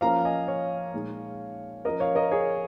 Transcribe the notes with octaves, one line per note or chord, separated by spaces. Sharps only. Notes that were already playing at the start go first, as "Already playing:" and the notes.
F3 A#3 C#4 F5 A#5
D#5 G#5
C#5 F5
A#2 G#3 D#4
F3 C#4 A#4 D#5
C#5 F5
A#4 D#5
G#4 C#5